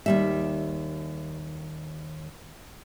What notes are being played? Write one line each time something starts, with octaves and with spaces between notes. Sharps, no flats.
D#2 G3 E5